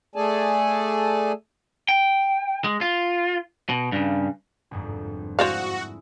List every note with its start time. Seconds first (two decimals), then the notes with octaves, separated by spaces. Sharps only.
0.16 A3 G#4 A4 D5 G#5 A5
1.89 G5
2.64 G#3
2.81 F4
3.69 B2
3.92 G2 C#3
4.71 G1 F2 G#2
5.39 G#3 E4 F#4 C5 D5 F5